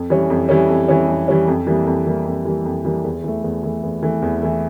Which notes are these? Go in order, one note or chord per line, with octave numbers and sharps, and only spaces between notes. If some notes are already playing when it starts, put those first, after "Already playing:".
Already playing: F2
E3 G3 C#4
F2
E3 G3 C#4
F2
E3 G3 C#4
F2
E3 G3 C#4
F2
E3 G3 A#3
F2
E3 G3 A#3
F2
E3 G3 A#3
F2
E3 G3 A#3
E2
E3 A3
E2
E3 A3
E2
E3 A3
E2
E3 A3